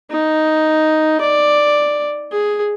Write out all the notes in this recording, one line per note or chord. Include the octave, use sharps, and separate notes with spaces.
D#4
D5
G#4